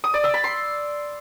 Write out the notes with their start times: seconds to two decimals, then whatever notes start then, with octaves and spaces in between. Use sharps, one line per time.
0.04 D#6
0.14 D5
0.24 E6
0.34 B5
0.44 C6